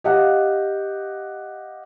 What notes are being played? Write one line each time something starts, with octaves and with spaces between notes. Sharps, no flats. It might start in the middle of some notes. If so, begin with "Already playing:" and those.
G4 D#5 F5 F#5